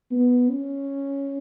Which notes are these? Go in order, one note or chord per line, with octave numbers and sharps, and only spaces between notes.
B3
C#4